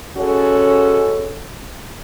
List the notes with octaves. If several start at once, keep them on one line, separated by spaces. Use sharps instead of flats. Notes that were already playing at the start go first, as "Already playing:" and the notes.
C#3 G#3 C#4 F#4 A4 C#5